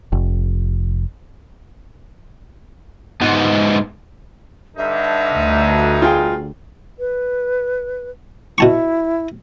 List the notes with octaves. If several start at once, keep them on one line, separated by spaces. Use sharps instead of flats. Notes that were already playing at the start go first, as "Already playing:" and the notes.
F1
G#2 B3
G2 D3 D#4 E5
D2
F4 G#4 G5
B4
B2 E4 A5 C#6